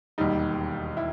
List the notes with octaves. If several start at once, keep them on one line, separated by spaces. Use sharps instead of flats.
E1 D#2 D#3 G3 D#4
E4